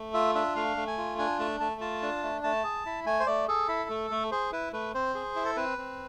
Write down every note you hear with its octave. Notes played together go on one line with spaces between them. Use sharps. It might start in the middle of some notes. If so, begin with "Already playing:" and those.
Already playing: A3
F4 E5
D4 E5
A3 F5
A3
G#5
F4
D4 G#5
A3 A5
A3 A5
F4 A5
D4
A3
A3 A5
G#4
E4
A3 G#5
C5
A3 D5
G#4 A4
E4
A3
A3
G#4 C5
E4 B4
A3 B4
C4 C5
G#4
E4
A4
C4 B4
C4